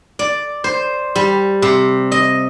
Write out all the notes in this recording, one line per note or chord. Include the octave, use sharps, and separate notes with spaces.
D5
C5
G3
C3
D#5